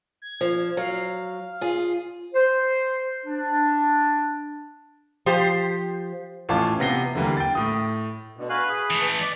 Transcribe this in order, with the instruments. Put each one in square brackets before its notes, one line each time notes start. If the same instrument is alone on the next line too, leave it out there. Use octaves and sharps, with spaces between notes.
[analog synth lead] G#6
[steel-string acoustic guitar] F3
[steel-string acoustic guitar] F#3 [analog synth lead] F5
[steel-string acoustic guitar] F4 G#4
[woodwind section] C5
D4
[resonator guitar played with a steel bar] F3 G4 C5
[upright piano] A1 E3 C#4 F4 A5 D6
C3 B3 A#6 C7 G7
D3 E3 G3 A#3
G5 A6
A2 D#6
[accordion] B2 D3
[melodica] F#4 F5 G#5 [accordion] B4 F#6
[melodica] G#4
[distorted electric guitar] E3 A3
[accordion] D5 [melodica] D#5